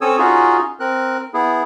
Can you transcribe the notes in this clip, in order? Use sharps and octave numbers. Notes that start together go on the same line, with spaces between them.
C4 C#4 A4 C#5 D#6 E6
C#4 D#4 F4 F#4 G#4
C4 A#4 F#6
B3 E4 G#4